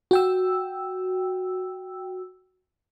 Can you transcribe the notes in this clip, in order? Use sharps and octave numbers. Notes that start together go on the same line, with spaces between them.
F#4 G5 E6